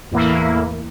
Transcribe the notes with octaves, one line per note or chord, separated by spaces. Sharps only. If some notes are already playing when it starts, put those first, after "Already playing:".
E2 A2 E3 A#3 E4